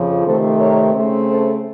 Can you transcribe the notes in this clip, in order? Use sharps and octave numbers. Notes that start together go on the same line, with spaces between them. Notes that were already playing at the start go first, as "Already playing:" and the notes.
Already playing: F2 C#3 F3
C3 D#3 A3 C4 A4 C5
A#4 C#5
C#3 A3 C4
A4 C5